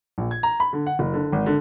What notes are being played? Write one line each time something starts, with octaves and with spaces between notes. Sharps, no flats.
A#1
G#6
A#5
B5
D3
F#5
F#1
D3
G#1
D3